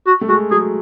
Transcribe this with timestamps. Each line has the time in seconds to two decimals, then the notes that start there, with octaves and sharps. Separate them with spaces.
0.07 F#4
0.21 A3
0.29 G#3 F#4
0.51 F#3 G#4